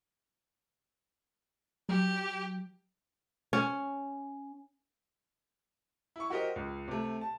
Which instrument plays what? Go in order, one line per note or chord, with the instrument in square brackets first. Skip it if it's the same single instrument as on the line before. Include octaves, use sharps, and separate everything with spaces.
[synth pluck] F#3 [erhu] G4
[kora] C#4
[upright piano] E4 C#6
F#4 G4 A#4 C5 D#5
C#2
C3 A3
A5